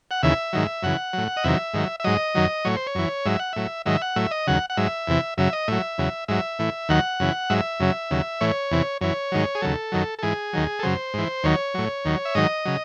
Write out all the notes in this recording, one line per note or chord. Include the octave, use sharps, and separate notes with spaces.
F#5
D#2 C#3 E3 E5
G#2 D#3 F#3
F#2 C#3 E3 F#5
A2 F#3
D#5
E2 C3 D#3 F#3 E5
G#2 D#3 F#3
E5
G#2 F#3 D#5
F#2 D#3 F#3
A2 F#3 C#5
C5
C#5
F#2 E3
G#2 F#3 E5
F#5
A2 F#3 E5
G#2 D#3 F#3 E5
F#5
A2 F#3 E5
D#5
D#2 C#3 F#3 F#5
F#5
G#2 F#3 E5
E2 C3 E3
F#2 C#3 F#3 E5
D#5
A2 F#3 E5
E2 C#3 F#3
G#2 F#3 E5
A2 E3
D#2 D#3 F#3 F#5
F#2 C#3 E3
G#2 F#3 E5
F#2 C#3 F#3
D#2 C#3 F#3
A2 E3 C#5
E2 C3 E3
F#2 E3 C#5
G#2 D#3 F#3
G#4
D#2 C#3 F#3 A4
F#2 D#3 F#3
A4
G#2 E3 G#4
D#2 D#3 F#3
A4
F#2 C#3 F#3 C5
G#2 E3
D#2 D#3 F#3 C#5
A2 F#3
D#2 D#3 F#3
E5
G#2 D#3 F#3 D#5
C#3 F#3